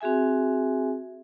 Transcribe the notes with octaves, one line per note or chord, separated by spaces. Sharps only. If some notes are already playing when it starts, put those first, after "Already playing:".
C4 F#4 G#4 E5 G#5